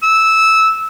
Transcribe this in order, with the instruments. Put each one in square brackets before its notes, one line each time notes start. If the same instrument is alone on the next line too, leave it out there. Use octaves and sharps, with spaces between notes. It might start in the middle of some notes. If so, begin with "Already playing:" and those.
[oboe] E6